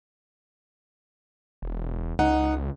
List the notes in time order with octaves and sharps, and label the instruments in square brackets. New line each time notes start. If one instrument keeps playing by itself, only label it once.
[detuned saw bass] E1
[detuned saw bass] C#2 [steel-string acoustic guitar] D#4 [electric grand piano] F#5